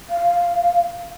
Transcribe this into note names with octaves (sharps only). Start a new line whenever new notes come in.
F5